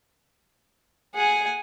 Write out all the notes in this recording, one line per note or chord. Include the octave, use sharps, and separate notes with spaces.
G#4 F#5 G#5